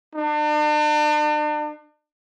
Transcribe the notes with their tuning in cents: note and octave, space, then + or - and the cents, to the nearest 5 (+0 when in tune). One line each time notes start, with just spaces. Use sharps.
D4 +40